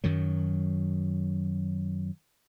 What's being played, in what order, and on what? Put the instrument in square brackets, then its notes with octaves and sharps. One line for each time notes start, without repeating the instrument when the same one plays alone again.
[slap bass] F#2 D#3 F#3